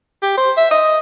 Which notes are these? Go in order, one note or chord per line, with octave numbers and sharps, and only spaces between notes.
G4
C5
E5
D#5